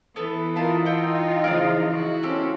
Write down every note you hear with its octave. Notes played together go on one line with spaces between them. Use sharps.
E3 B3 A4 B4
D#4 F4 A#4 A5 B5
D#4 F4 D#5 F#5 G5 E6
C#3 E3 F3 A#4 D5 F5
E4 F#4
C4 C#4 F4 G4 A4